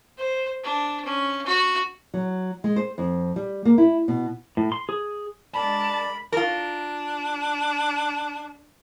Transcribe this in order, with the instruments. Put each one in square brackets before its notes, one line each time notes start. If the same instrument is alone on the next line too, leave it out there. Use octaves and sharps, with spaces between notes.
[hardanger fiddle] C5
D4
C#4
F#4
[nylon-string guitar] F#3
G#3
C5
F2
G3
A#3
E4
B2
[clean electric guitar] A2
C6
G#4
[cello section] G#3 D4 A#4 [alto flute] D5 [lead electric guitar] A5 [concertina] B5
[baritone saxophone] D4 [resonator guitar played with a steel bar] F4 A#4